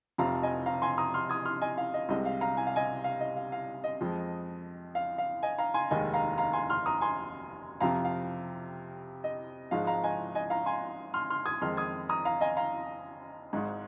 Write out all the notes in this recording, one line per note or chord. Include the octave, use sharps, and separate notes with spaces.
F1 F2 C3 F3 F5 A#5
D#5 G#5
F5 A#5
G#5 C6
A#5 D#6
C6 F6
D#6 G#6
C6 F6
D#5 G#5
F5
D#5
C2 C3 G#3 D#5
F5
F5 A#5
G#5
F5
D#5 G#5
F5
D#5
F5
F5
D#5
F2 F3 G#3
F5
F5
D#5 G#5
F5 A#5
G#5 C6
F1 D#2 D#3 G#3 D#5 G#5
F5 A#5
F5 A#5
G#5 C6
C6 F6
A#5 D#6
G#5 C6
F2 C3 F3 F5 A#5
F5
D#5
G#1 G#2 F3 G#3 F5
F5 A#5
D#5 G#5
D#5 G#5
F5 A#5
G#5 C6
C6 F6
C6 F6
D#6 G#6
F2 D#3 G#3 C6 F6
D#6 G#6
A#5 D#6
F5 A#5
D#5 G#5
F5 A#5
G#1 G#2 G#3